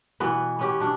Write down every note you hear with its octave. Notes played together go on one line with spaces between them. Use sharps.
B2 E3 B3
B3 C#4 G4
B2 D4